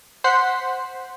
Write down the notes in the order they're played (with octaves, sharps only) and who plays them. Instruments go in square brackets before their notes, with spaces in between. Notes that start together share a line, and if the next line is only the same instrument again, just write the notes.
[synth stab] C5 F#5 B6 C7